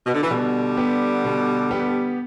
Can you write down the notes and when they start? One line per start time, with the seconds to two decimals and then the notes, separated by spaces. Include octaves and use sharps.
0.07 B2
0.14 D3
0.23 E3
0.31 B2 D3 G3
0.77 B3 G4
1.25 B2
1.71 B3 G4